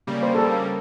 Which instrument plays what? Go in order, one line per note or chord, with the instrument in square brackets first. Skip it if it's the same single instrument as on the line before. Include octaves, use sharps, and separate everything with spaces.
[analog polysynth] C#3 G3 A#3
[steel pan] C5
A4 A#4 A5